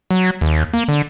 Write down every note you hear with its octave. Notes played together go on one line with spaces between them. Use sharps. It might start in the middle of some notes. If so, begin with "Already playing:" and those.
F#3
D#2
A#3
D3